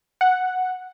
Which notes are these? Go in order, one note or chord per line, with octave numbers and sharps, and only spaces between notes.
F#5